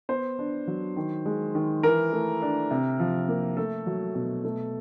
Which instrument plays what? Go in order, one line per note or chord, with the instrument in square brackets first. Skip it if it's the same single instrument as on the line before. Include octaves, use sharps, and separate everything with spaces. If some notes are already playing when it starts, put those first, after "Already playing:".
[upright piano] B3 C5
D4
F#3
D#3
G#3
D#3
E3 A#4
A3
D4
C3
F3
A#3
A3 A4
F#3
B2
A3